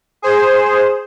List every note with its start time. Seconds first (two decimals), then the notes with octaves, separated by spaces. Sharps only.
0.22 G#4 C5